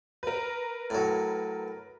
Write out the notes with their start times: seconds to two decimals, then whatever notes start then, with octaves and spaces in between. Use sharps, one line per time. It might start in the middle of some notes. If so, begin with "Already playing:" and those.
0.23 A#4 B4
0.90 A2 F#3